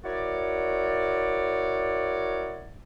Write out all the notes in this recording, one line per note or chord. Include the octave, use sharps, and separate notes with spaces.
E4 F#4 A#4 C#5 D5